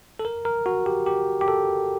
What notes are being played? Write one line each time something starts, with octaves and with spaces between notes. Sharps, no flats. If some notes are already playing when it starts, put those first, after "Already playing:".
A4
A#4
A#4
F#4
G4
G4
G4
A4